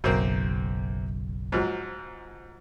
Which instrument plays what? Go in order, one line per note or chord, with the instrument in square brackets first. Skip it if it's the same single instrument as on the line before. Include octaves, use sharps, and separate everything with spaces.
[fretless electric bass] F#1 B1 [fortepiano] F#2 A#3 C4
[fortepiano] G#2 F3 F#3